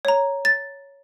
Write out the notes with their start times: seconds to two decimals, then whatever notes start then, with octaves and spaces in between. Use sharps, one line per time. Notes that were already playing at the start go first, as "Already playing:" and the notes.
0.05 C#5 A#5
0.45 A6